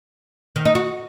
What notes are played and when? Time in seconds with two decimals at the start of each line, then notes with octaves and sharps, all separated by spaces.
0.56 D#3
0.65 D#4
0.75 F#4